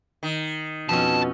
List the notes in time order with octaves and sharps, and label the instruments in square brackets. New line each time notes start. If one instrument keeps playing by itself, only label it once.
[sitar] D#3
[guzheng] F2 C#4 [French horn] B2 [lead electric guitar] A5